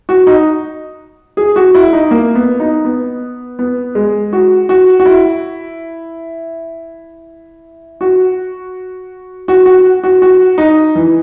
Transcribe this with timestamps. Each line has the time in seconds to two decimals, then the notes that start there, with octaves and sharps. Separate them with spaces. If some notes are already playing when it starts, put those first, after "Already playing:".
0.09 F#4
0.27 D#4
1.37 G#4
1.56 F#4
1.75 E4
1.93 D#4
2.11 A#3
2.35 B3
2.60 D#4
2.85 B3
3.59 B3
3.95 G#3
4.33 F#4
4.69 F#4
5.00 F#4
5.06 E4
8.01 F#4
9.48 F#4
9.66 F#4
10.04 F#4
10.22 F#4
10.58 D#4
10.95 E3